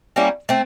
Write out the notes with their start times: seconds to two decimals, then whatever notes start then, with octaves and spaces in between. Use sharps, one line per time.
0.16 G3 A#3 C#4 E4
0.49 A3 C4